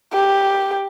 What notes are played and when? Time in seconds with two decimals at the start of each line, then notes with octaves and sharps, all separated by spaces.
0.14 G4